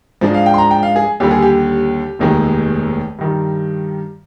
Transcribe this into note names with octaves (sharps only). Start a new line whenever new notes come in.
G#2 F3 G#3 D4
F5
G5
C6
A#5
G5
F5
G#4
D#2 D3 G3 G4
G#4
G4
F1 D#2 D#3 G#3
G2 D#3 G3